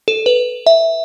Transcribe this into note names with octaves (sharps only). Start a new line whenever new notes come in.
A4
B4
E5